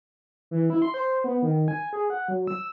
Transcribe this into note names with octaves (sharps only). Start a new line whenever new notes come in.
E3
E4
C6
C5
B3
D#3
G#5
G#4
F#5
F#3
E6